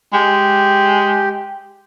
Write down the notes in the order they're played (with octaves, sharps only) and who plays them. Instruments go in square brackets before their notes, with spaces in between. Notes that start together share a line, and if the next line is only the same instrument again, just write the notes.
[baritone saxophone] G#3 [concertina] G4